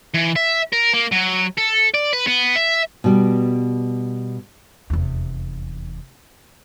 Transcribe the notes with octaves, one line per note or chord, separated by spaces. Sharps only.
E3
E5
A#4
A#3
F#3
A4
D5
B4
B3
E5
B2 G3
F1 E2